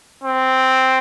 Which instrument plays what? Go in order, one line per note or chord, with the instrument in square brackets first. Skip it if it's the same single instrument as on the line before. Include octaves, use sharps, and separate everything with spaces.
[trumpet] C4